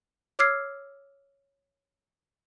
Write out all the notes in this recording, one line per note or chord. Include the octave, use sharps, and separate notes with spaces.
C#5 D6 E6 F6 G#6 C7